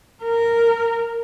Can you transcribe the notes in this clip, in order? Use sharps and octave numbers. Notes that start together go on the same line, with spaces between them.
A#4